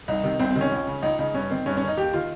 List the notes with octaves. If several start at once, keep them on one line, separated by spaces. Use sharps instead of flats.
C2 D#4
C3 D#3
C2 C4
C4
C3 D#3
C#4
C#2
C#3
C#2 D#4
C#3 D#4
G2 C#4
D#3 C4
G2 C#4
C#4
D#3
D#4
D#2 G4
D#3 F4